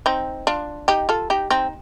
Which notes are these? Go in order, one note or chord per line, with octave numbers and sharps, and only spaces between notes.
C4 D#4
D4 F4
D#4 G4
F4 A4
D#4 G4
C4 D#4